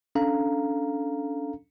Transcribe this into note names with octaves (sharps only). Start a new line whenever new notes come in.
C#4 D4 A4 F5 A#5